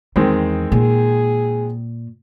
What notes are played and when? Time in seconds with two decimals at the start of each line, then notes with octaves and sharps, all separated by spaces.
0.16 E2 D#3 G#3 C4
0.72 A#2 G#4